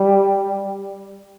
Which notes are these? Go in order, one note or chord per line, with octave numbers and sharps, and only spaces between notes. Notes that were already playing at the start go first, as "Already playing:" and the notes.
Already playing: G3